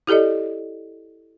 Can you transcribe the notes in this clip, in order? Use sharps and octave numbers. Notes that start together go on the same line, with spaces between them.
E4 G4 A4 D5 D#5